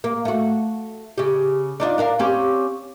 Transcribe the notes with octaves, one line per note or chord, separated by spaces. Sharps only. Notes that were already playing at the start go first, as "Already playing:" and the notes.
A#3
A3 F#4
C#3 G4
D4 D#4 F4
D4 A#4 F5
C4 C#4 G4